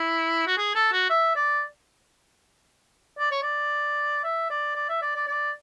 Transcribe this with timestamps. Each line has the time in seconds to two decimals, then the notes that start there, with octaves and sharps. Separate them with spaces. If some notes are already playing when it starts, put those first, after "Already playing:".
Already playing: E4
0.47 F#4
0.58 G#4
0.75 A4
0.92 F#4
1.10 E5
1.35 D5
3.18 D5
3.31 C#5
3.43 D5
4.24 E5
4.50 D5
4.75 D5
4.89 E5
5.02 D5
5.15 D5
5.27 D5